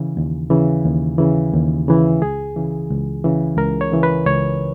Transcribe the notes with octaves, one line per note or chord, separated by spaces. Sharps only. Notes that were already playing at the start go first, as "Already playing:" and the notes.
Already playing: C#3 E3
D#2
C#3 E3
D#2
C#3 E3
D#2
C#3 E3
C#2 G#4
C#3 E3
C#2
C#3 E3
C#2 A#4
C#5
C#3 E3
B4
C#2 C#5